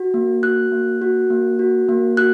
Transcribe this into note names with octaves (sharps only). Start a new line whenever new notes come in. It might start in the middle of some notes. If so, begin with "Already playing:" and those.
Already playing: F#4
A#3
F#4 F#6
A#3
F#4
A#3
F#4
A#3
F#4 F#6